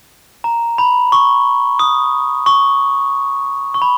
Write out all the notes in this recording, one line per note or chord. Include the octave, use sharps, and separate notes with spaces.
A#5
B5
C#6
D#6
C#6
C#6
B5